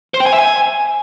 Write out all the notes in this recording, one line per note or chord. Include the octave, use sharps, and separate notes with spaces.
C5
G5
G#5
E5
G#5